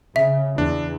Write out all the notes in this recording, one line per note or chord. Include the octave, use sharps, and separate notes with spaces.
C#3 E5
E2 D4